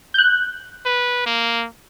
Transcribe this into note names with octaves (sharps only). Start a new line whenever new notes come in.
F#6 G6
B4
A#3